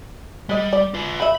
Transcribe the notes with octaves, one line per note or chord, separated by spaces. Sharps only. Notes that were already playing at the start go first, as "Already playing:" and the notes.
G3 G#3 D#5
D5
F4 B4
C#3 E5 B5